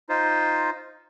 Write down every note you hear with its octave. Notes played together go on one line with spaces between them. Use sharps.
D#4 F4 C5